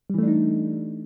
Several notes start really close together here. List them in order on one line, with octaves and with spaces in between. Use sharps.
G3 E3 A3 D4 D#4